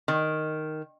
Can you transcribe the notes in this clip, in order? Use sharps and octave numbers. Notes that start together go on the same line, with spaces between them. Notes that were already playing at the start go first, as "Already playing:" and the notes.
D#3